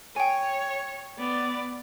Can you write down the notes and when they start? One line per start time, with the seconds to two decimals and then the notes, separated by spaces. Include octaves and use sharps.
0.16 C#5 G5 G#5
1.18 B3 D5